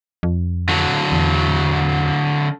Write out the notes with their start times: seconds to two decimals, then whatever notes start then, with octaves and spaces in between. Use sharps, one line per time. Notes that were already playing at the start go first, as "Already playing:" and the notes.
0.23 F2
0.69 D3 F#3
1.12 E2